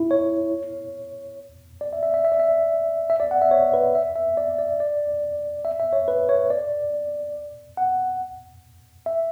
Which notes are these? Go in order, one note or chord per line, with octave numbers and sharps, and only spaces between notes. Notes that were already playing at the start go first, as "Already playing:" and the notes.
Already playing: E4
C#5
D5
E5
E5
E5
E5
D5
E5
E5
D5
F#5
E5
C#5
B4
E5
E5
D5
D5
D5
E5
E5
C#5
B4
C#5
D5
F#5
E5